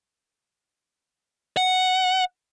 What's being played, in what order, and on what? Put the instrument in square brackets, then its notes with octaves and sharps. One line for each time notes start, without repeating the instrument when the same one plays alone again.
[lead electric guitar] F#5